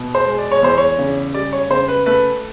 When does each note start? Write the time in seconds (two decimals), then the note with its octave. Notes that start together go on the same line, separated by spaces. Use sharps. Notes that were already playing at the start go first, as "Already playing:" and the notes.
Already playing: B2
0.15 C5
0.26 G#3
0.39 D5
0.52 C#5
0.63 E2 C5
0.78 C#5
0.99 C#3
1.34 G3 D5
1.53 C#5
1.70 C#3 C5
1.88 B4
2.06 A3 B4